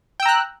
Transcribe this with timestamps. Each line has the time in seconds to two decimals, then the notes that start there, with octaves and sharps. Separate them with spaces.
0.20 G5
0.23 E6
0.26 A#5
0.29 F#6